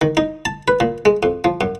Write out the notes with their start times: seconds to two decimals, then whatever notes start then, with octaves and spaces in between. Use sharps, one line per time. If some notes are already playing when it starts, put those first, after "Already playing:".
0.01 D#3
0.17 D#4
0.45 A5
0.68 B4
0.80 A#2
1.05 G#3
1.23 F2
1.44 F3
1.61 F#2